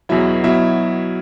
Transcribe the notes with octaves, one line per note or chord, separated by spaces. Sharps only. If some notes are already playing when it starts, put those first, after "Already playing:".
E2 B2 F#3 E4 E5
B2 F#3 E4 E5